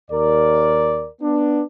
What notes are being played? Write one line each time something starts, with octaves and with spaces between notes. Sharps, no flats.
D#2 A#4 D5
B3 D4